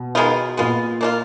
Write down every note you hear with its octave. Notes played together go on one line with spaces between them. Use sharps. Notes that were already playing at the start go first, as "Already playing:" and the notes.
Already playing: B2
D#3 G#3 B3 F4
A#2 G#3 B3 F4
A#3 D4 F4